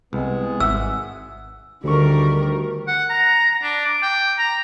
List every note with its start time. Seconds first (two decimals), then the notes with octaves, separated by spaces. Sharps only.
0.13 C2 G#3 B3
0.60 G#1 E5 F#5 E6
1.84 D2 D3 D#3 G3 A#4 C#6
2.87 F#5
3.10 A#5
3.62 D4
3.85 D6
4.02 G5
4.38 A#5